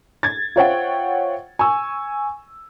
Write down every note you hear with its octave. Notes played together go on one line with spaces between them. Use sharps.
G#6 A6
F4 C5 C#5 E5 F#5 G5
G#5 C#6 E6